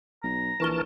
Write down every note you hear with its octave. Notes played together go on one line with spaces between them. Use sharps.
B1 A#5
A#1 E3 E4 A#4 A5 C#6 G7